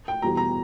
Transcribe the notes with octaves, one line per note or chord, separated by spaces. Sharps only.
G5
E2 B2 G3 A#5
A#5